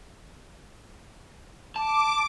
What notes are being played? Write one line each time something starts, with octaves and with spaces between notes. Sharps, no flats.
A5 D6